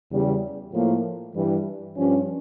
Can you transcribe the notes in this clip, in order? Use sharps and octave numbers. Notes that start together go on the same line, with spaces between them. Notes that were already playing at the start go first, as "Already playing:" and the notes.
E2 C#3 G3
A2 F3 A#3
G2 E3 G3
G2 F3 C#4